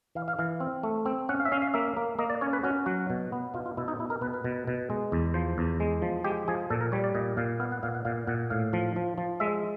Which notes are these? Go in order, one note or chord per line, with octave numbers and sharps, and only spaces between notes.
E3 F5
F5
E3 F5
C4
A3
C4
C#4 F#5
F5
E5
C#4 F5
F5
A#3 E5
A#3
A#3 D#5
D5
C#4 C#5
B4
C#4 F#4
F#3 F#4
B2
B3
B2 F4
F4
B2 E4
D#4
B2 E4
A#4
B2 B4
B4
B2
B2
G#3
E2
F3 C5
E2
G#3
F3
G#3 G4
F3 G#4
A#2 A4
A#4
G3 C#5
D5
A#2 D#5
A#2 F5
B3 F5
F#5
A#2 F5
F#5
A#2 F5
A#2 F#5
A2 F5
F3
F3
F3
G#3 E5